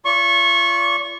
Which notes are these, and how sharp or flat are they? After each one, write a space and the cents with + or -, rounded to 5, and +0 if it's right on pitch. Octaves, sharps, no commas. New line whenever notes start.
F4 -35 D5 -40 C#6 -20